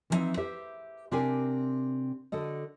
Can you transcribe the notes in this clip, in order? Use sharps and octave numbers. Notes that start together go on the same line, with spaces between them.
E3 F3 G3 C4 D#4 E5
G4 B4 C5 E5
C3 C4 D4 G4 A#4 G#5
D3 F#4 A4 D#5